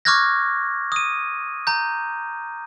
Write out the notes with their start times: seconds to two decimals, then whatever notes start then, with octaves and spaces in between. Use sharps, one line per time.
0.05 C#6 D6 F6 F#6 G#6 A#6
0.92 D#6 D#7
1.67 A#5 G6